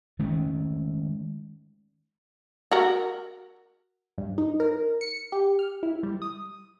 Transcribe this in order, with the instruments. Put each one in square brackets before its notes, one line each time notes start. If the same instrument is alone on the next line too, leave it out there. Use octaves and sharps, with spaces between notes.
[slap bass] D#3 G#3 A3 C#4
[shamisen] F#4 A#4
[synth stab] G2
D#4
A#4
C#7
G4
F6
E4
G3
D#6